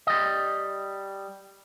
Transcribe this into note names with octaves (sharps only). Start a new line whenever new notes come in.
G3 D#5